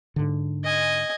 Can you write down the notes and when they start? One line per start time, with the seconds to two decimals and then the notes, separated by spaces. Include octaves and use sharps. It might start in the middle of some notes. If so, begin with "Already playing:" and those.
0.16 G#2 D3
0.64 D#5 G#5